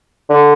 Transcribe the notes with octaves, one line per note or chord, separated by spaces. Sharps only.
D3